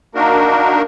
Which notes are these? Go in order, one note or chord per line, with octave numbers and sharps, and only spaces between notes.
A#3 D4 D#4 F#4 A#4